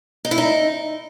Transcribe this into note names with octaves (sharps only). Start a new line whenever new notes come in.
D#4
E4
D#4